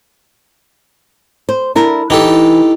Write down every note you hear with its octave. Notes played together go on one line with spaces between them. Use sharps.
C5
D4 E4 A#4
E3 D#4 G4 A4